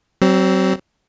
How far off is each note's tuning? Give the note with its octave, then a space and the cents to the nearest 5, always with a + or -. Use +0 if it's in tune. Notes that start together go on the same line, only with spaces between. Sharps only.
F#3 +35 C4 +0